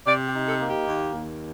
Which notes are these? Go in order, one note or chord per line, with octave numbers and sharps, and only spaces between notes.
C3 D5
G4
D#4
A4
A#3
G4
D#2
D#2